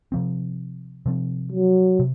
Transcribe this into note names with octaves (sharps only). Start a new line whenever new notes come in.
C3 F3 C4
C3 F3 C4
F#3
C3